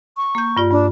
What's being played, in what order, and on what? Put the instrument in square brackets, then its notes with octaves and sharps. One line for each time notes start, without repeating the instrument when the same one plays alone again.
[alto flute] C#6
[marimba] A#3 G6
G2 F4 D5
[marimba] G2 [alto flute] D4